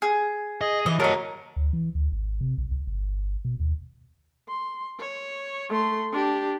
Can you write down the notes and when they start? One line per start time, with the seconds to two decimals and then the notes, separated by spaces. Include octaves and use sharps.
0.02 G#4
0.61 G#4 D#5
0.86 E3 D#5
1.00 F#3 A#4 C#5 D#5 A5
1.56 D2
1.73 E3
1.95 D2
2.12 G#1
2.41 C3
2.58 B1
2.71 C2
2.87 G1
3.45 B2
3.60 D#2
4.49 C6
5.00 C#5
5.70 A3 C6
6.12 D4 G4